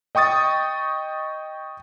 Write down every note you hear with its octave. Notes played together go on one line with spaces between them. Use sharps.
D#5 G5 C#6 D#6 A6